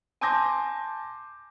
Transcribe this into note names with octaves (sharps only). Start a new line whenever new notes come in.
G#5 A5 C6 D6 G6 A#6